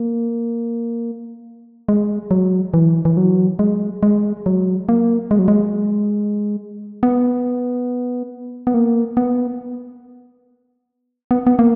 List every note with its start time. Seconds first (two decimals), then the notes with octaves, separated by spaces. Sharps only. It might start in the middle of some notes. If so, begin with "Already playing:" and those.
Already playing: A#3
1.89 G#3
2.31 F#3
2.74 E3
3.05 E3
3.17 F#3
3.59 G#3
4.03 G#3
4.46 F#3
4.89 A#3
5.31 G#3
5.39 F#3
5.48 G#3
7.03 B3
8.67 B3
8.74 A#3
9.17 B3
11.31 B3
11.47 B3
11.59 A#3